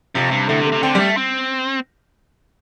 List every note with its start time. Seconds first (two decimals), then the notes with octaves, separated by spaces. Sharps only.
0.15 F2 C3
0.31 G2
0.49 A2 D3
0.60 C3
0.66 A3
0.72 C3
0.83 D3 C4
0.95 G3 A3
1.17 C4